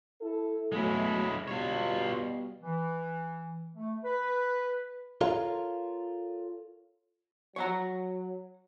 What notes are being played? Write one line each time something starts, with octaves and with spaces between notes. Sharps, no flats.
E4 A4
B2 F#3 G#3 A3 E4
B2 G3 F4 C#5
E3
A3
B4
F4 A4 A#4 C#5 F5
F#3 C#5 F#5 A#5